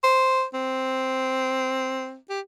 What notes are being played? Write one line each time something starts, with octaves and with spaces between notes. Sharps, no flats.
C5
C4
G4